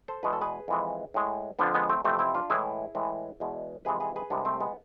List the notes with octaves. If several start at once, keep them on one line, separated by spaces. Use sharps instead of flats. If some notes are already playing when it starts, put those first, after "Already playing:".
A4 C5
E2 B2 G#3 B4
A4
G#4 B4
F2 E3 G#3
A2 G#3
F2 D3 F3 B3 D4
G#3 B3
A3 C4
F2 C3 E3 A3 C4
C4 E4
D4 F4
A2 E3 G#3 E4 G#4
A2 E3 G#3
E2 B2 G#3
F2 C3 E3 G#3 G#4 B4
G#4 B4
G#4 B4
C2 C3 G#3 B3 D4
A3 C4
G#3 B3